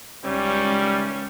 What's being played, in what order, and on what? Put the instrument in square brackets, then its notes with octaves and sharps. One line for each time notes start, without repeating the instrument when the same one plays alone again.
[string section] C#2 [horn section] D#3 E3 C#4 [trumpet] G3